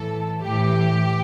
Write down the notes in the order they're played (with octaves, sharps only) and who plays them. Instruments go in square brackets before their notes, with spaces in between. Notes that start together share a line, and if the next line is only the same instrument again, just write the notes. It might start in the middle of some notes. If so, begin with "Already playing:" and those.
Already playing: [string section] A2 E3 A4
A2 E3 G4